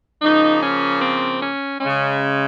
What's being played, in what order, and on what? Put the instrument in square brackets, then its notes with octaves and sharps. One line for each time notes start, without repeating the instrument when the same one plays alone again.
[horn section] C#3 F3 A#3 D#4
C#4
C4
C#4
C#3 G#3 C#4